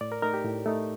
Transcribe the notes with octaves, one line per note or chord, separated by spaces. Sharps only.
A2 D5
A#4
A3 D#4 A#4
G4
A2
A3 D#4